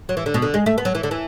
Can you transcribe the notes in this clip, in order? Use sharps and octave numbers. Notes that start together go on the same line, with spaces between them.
F#3
E3
D3
B2
D3
G#3
A3
B3
F#3
E3
D3
E3